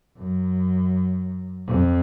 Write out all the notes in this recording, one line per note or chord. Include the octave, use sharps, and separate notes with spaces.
F#2
F2